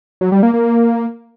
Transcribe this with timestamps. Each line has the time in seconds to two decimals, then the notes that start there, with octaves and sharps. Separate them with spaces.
0.21 F#3
0.32 G3
0.43 A#3
0.54 A#3